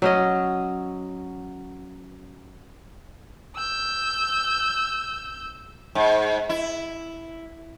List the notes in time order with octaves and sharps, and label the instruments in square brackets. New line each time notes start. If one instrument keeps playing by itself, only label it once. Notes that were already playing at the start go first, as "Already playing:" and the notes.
[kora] F#3 C#4 D#5
[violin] E6 G6
[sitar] G#2
E4